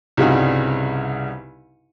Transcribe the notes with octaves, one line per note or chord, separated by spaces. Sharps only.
C2 G2 C#3 D#4 F#4